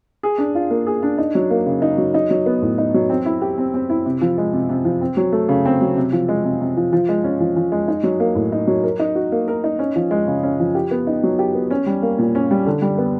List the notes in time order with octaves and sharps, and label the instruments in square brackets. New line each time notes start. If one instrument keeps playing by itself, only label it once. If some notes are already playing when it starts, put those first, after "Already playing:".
[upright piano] G#4
D4
F4
A#3
G#4
D4
D#4
F#3
A#3
C#3
D#4
F#3
D#4
F#3
B3
A2
D#4
F#3
C4
E4
G4
C4
C4
E4
C3
F3
G#3
C3
C3
F3
C4
F#3
A3
C#3
C4
F#3
C3
F3
G#3
C3
C3
F3
F3
G#3
C#4
F3
F3
G#3
D#4
F#3
A#3
A2
D#4
F#3
A#4
D#4
F#4
A#3
A#4
D#4
C#4
F3
G#3
C#3
C#4
F3
G4
B3
D#4
F#3
G4
B3
C#4
G3
A#3
A#2
C#4
G3
D3
G3
B3